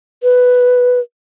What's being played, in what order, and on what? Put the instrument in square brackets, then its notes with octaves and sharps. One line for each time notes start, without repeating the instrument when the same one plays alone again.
[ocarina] B4